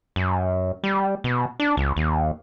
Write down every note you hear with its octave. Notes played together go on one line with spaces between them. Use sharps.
F#2
G3
B2
D4
C#2
D#2